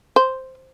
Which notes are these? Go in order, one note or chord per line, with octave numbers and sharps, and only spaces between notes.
C5